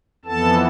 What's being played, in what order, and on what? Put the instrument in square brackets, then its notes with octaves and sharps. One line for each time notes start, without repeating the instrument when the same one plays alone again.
[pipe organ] F2 E3 B3 A4 A5